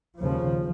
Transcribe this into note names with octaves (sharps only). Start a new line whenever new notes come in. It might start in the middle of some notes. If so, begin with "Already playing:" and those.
D#2 C#3 F3